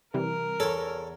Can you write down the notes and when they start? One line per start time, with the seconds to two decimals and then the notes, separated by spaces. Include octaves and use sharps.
0.14 C3 E3 G3 A#4
0.60 E2 A4 C#5